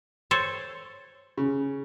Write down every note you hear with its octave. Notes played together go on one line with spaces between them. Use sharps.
A4 C5 C#5
C#3